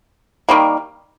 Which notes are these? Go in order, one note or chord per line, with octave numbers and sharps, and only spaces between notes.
D#3 G3 A#3